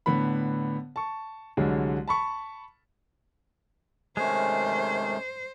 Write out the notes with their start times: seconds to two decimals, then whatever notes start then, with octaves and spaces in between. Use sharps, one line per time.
0.06 A2 D3 B3 B5
0.96 A5 C#6
1.57 C2 D3 F#3 G#3
2.08 A5 B5 C#6
4.17 C3 D#3 G#3 A3 C#4 C5